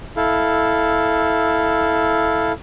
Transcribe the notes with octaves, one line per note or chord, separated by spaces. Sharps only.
E4 A4 F5